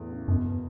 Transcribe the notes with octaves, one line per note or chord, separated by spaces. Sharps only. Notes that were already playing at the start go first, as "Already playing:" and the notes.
Already playing: E2 A2 E3
C#3
F#2 B2
B3